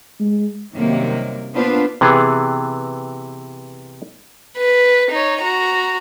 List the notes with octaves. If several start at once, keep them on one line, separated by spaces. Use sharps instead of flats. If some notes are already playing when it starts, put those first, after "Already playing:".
G#3
F#2 C3 D#3 G3 A#3
A#3 B3 D4 F4 B4 C5
C3 E3 B3 G#4
B4
D#4 C#5
F#4 A#5